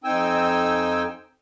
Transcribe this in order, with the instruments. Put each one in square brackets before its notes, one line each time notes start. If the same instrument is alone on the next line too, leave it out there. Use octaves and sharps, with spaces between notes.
[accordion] F2 C4 D#4 G5 G#5 E6